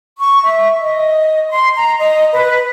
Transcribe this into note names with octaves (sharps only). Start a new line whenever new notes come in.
C#6
E5
D#5
C6
A#5
D#5
B4